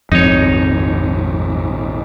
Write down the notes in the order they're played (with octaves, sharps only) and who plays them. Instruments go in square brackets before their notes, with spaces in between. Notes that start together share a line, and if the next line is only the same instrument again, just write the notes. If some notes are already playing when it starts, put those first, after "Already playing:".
[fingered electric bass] A#1 G#2 D#3 [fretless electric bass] F2 [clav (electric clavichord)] D#4 C#5